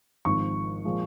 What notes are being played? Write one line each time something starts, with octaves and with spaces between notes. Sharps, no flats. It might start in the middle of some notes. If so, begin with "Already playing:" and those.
G#1 G#2 F3 C#6
A#2 F3 G#3